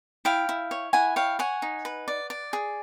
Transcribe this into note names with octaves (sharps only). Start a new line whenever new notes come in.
E4 F5 G5
E4
C#5
E4 F#5 G#5
C#5 F5 G5
C#5 F#5 G#5
D#4
B4
D5
D5
G#4